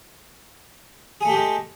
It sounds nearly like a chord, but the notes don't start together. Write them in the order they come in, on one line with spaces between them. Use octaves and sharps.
G#4 A3 G4 G#3